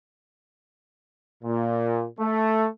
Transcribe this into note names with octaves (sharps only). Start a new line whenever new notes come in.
A#2
A3